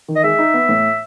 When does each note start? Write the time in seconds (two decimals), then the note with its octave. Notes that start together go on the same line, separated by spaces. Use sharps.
0.08 D#3
0.16 D#5
0.24 G#3 E5
0.39 D#4
0.54 B3
0.69 A2